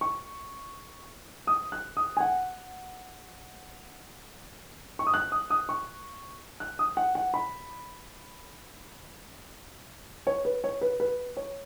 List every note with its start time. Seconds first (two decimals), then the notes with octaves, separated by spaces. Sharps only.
0.01 C#6
1.47 D#6
1.72 F#6
1.97 D#6
2.17 G#5
2.20 F#5
4.99 C#6
5.07 D#6
5.14 F#6
5.32 D#6
5.50 D#6
5.69 C#6
6.60 F#6
6.79 D#6
6.97 F#5
7.15 F#5
7.34 B5
10.27 C#5
10.45 B4
10.64 C#5
10.81 B4
11.00 B4
11.37 C#5